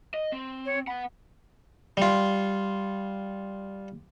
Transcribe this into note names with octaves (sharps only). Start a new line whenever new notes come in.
D#5
C4
C#5
B3 F#5 B5
G3 F4